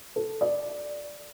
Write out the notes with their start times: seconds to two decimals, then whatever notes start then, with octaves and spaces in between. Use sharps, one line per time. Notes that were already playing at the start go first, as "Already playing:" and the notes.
0.16 A4
0.41 D5